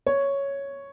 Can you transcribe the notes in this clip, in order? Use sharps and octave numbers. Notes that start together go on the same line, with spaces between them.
C#5